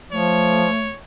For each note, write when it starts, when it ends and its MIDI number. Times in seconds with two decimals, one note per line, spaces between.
0.12 0.68 53
0.12 0.85 57
0.12 0.97 73